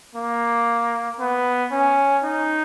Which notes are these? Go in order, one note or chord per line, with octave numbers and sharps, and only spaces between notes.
A#3
B3
C#4
D#4